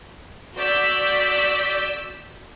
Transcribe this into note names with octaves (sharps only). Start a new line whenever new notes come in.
F#4 D5 E6 G6 B6